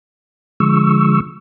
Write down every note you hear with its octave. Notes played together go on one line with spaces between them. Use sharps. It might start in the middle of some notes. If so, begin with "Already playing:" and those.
D3 F3 G#3 C#6 E6